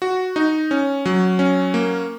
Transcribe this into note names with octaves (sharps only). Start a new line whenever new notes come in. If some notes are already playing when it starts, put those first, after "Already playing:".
F#4
D#4
C#4
F#3
C#4
A#3